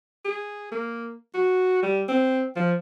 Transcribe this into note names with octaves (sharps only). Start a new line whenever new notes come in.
G#4
A#3
F#4
G3
C4
F3